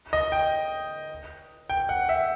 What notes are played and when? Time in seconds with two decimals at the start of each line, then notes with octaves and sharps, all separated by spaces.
0.13 D#5
0.32 G5
1.70 G5
1.89 F#5
2.09 E5